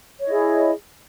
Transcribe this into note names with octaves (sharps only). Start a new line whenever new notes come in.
E4 G#4 C#5 D#5